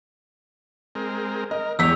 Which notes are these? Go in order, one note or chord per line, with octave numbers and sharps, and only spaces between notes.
G#3 C4 A#4
A#4 D#5
E2 G#3 G4 C#5 E6 B6 F7